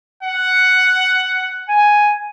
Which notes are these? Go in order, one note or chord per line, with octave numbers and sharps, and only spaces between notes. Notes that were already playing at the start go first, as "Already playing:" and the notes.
F#5
G#5